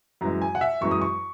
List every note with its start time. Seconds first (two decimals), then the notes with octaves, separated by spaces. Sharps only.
0.21 F#2 E3 G#3 A#5
0.42 G#5
0.55 F#5
0.61 E5
0.81 F#2 E3 G#3 C#6
0.91 D#6
1.01 C#6